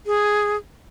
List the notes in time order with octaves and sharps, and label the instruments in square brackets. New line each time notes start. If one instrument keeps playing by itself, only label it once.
[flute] G#4